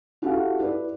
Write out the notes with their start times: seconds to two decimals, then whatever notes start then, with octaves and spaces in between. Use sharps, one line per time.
0.22 E4 F#4 G4 A4 F5 F#5
0.59 E4 B4 D5